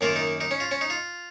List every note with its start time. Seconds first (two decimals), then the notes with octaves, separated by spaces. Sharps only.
0.01 F#2 D#3 A#3 F4
0.16 D#4
0.41 D#4
0.51 C#4
0.60 F4
0.71 C#4
0.81 D#4
0.90 F4